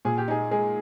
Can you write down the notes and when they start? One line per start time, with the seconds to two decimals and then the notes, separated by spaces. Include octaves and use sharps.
0.05 A#2 G#4
0.18 G4
0.28 D#4 G#4
0.51 G#3 G#4